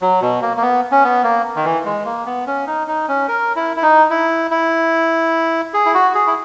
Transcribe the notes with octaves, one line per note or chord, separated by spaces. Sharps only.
F#3
B2
A#3
A#3
B3
C#4
B3
A#3
D#3
E3
G#3
A#3
B3
C#4
D#4
D#4
C#4
A#4
E4
E4
D#4
E4
E4
G#4
E4
F#4
G#4
E4